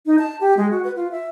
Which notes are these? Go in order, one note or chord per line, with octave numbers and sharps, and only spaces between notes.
D#4
A5
G4
G#3
F#4
B4
F4
E5